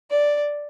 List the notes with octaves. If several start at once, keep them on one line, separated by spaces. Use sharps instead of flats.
D5